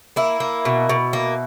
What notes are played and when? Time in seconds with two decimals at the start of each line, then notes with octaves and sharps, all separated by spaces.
0.16 A#3 E4
0.40 A#3
0.65 B2
0.89 B2
1.13 A#3